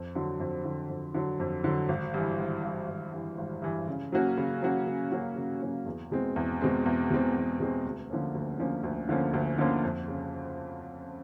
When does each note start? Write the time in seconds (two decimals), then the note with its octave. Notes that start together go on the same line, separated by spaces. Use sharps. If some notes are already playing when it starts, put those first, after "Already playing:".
Already playing: F2
0.15 D3 F#3
0.40 F2
0.65 D3 F#3
0.90 F2
1.14 D3 F#3
1.40 F2
1.64 D3 F#3
1.89 G#1
2.14 G2 E3
2.39 G#1
2.64 G2 E3
2.88 G#1
3.13 G2 E3
3.38 G#1
3.62 G2 E3
3.87 C#3
4.12 F#3 A#3 C#4 F#4
4.37 C#3
4.62 F#3 A#3 C#4 F#4
4.87 C#3
5.12 F#3 A#3 C#4 F#4
5.36 C#3
5.62 F#3 A#3 C#4 F#4
5.86 E2
6.11 B2 G#3 C4
6.36 E2
6.61 B2 G#3 C4
6.85 E2
7.10 B2 G#3 C4
7.35 E2
7.60 B2 G#3 C4
7.85 D2
8.10 D3 F3 A#3 C#4
8.35 D2
8.59 D3 F3 A#3 C#4
8.84 D2
9.09 D3 F3 A#3 C#4
9.34 D2
9.58 D3 F3 A#3 C#4
9.83 F2
10.08 C#3